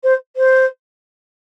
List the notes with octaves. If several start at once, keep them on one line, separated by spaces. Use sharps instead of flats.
C5
C5